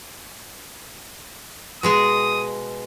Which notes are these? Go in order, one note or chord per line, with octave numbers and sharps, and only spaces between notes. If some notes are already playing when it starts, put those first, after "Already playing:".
B2 G#3 G#4 D#6